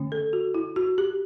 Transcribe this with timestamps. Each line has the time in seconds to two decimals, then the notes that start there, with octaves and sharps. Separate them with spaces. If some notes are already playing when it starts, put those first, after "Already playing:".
Already playing: D3 A3 C#4
0.12 A4
0.33 F#4
0.55 E4
0.76 F#4
0.98 G4